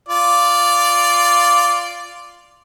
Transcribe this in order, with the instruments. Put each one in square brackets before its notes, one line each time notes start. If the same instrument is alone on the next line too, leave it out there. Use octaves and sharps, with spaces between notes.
[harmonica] F4 D5